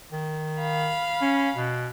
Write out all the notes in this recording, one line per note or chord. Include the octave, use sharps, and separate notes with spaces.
D#3
F5 B5
C#4
B2